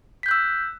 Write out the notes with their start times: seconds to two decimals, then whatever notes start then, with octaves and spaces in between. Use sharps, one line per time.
0.23 B6
0.26 G6
0.28 F#6
0.31 E6